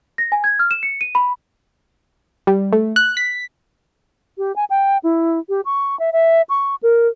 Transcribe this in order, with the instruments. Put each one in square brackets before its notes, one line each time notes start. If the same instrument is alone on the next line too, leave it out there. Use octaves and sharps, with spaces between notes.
[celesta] A#6
G#5
G#6
F6
E7
C#7
D#7
B5
[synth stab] G3
A3
F#6
B6
[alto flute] G4
G#5
G5
E4
G4
C#6
E5
E5
C#6
A#4